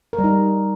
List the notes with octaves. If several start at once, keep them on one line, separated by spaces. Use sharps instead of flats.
A#4
G3
D#4